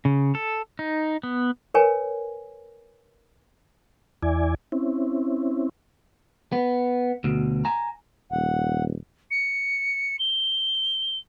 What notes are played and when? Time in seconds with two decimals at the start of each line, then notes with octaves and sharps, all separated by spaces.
0.05 C#3
0.35 A4
0.79 D#4
1.23 B3
1.74 A#4 B4 C#5 G#5
4.23 E2 E4 D5 G#5
4.72 C4 C#4 E4
6.52 B3
7.24 D2 B2
7.65 G#5 A#5
8.32 D#1 F#5
9.31 C#7
10.19 G7